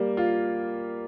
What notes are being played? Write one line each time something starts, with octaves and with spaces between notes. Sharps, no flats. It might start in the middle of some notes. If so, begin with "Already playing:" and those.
Already playing: G3 A#3
F4